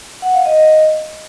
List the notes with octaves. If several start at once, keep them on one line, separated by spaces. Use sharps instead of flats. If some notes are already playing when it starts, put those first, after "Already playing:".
F#5
F5
D#5